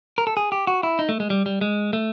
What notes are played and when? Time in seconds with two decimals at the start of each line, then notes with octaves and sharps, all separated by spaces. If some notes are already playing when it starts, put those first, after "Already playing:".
0.18 A#4
0.27 A4
0.37 G#4
0.52 G4
0.67 F#4
0.83 E4
0.99 D#4
1.09 A3
1.20 G#3
1.30 G3
1.46 G3
1.61 G#3
1.93 A3